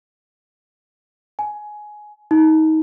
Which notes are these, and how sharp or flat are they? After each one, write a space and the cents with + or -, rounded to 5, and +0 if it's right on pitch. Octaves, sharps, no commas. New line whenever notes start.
G#5 +15
D#4 +25